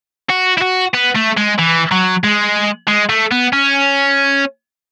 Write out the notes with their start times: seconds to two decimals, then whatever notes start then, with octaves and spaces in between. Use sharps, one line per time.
0.30 F#4
0.58 E4
0.62 F#4
0.94 B3
1.16 A3
1.37 G#3
1.59 E3
1.91 F#3
2.24 G#3
2.88 G#3
3.10 A3
3.32 B3
3.53 C#4